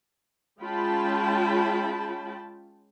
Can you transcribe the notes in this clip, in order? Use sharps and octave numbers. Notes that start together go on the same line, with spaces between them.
G#3 C#4 F4 G5 A5 B5